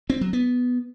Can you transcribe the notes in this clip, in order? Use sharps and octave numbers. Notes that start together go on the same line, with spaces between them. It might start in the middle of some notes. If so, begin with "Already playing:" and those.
C4
F#3
B3